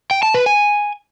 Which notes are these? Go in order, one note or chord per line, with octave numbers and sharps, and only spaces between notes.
G5
A5
B4
G#5